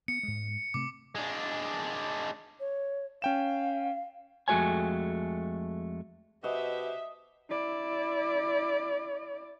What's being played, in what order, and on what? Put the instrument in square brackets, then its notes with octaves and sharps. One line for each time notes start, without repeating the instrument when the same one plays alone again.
[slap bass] B3 [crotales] C#7
[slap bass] G#2 G#3
[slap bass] C3 A3 C4 [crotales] D6
[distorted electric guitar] G#3 D4
[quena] C#5
[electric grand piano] C#4 G5 E7 [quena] F5
[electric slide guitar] F2 G#3 A3 F#4 C#5 G#5
[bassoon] B2 [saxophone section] F#4 G4 C5 [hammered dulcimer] D#5 [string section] E5
[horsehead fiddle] E4 D5